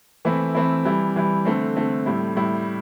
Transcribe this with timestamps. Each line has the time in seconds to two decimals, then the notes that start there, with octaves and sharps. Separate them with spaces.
0.25 E3 A3 C4 E4
0.55 E3 A3 C4 E4
0.85 E3 G3 E4
1.16 E3 G3 E4
1.45 D3 A3 C4
1.76 D3 A3 C4
2.06 A2 G3 E4
2.37 A2 G3 E4